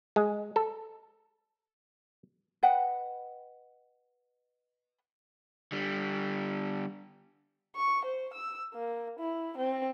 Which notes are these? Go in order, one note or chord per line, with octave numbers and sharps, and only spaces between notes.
G#3
A4
B4 D#5 F#5 G5
D3 G3
C#6
C5
E6
A#3
E4
C4